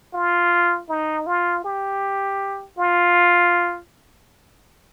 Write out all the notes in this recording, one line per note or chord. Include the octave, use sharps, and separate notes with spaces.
F4
D#4
F4
G4
F4